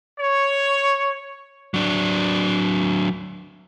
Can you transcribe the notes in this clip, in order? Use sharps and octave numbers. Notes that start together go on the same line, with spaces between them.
C#5
F#3 D4